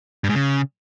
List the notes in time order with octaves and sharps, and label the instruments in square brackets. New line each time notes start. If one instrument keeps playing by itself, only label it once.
[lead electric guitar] G2
G#2
C#3